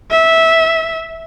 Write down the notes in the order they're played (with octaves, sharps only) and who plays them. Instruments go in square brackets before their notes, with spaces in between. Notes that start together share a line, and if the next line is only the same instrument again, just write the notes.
[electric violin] E5